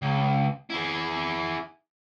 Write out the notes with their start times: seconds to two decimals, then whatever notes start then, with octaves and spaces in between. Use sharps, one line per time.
0.02 C#2
0.70 E4 G#4